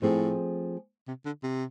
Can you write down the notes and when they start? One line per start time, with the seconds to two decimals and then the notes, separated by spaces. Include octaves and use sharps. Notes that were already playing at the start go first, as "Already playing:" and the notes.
0.02 A2 F3 A3 C4 G#4
1.08 C3
1.26 D3
1.43 C3